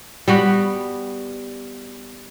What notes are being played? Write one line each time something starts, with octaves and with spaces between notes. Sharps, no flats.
G3 B3 F#4